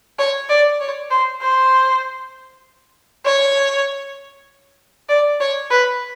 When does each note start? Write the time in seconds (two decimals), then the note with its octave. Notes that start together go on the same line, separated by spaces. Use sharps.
0.19 C#5
0.49 D5
0.80 C#5
1.10 C5
1.41 C5
3.25 C#5
5.09 D5
5.40 C#5
5.71 B4